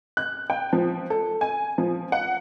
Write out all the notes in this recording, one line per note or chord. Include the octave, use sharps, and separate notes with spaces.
F#6
G5
F3
A4
G#5
F3
F#5